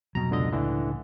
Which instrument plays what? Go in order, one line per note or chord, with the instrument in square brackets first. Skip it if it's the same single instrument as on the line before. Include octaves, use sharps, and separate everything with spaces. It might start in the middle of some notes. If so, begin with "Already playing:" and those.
[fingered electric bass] F1 B2 F#3 [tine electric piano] A#5
[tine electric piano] C#2 D3 D#5
[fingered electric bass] C#2 A2 [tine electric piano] D3 E3